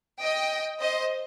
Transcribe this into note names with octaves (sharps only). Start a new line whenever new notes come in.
D#5 G5
C5 D#5